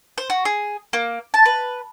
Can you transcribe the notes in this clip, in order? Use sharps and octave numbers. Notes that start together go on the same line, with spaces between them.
C5
F#4
G#4
A#3
A5
B4